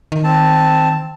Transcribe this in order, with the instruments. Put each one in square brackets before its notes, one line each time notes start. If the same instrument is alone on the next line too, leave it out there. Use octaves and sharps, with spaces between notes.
[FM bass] D#3
[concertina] C4 A5